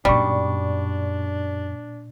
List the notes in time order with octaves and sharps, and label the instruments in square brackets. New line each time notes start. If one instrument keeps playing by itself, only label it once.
[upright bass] F#2 D#4 [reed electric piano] A#2 D5 C#6 [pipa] G3 [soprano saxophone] D4